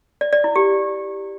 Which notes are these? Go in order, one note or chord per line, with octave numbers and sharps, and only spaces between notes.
D5
D5
E4
G4